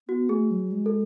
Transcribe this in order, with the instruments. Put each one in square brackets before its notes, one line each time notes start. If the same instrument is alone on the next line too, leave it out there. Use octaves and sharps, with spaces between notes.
[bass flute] B3 [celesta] F#4
[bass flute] A3 [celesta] G#4
[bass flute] F#3
G#3
[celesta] A4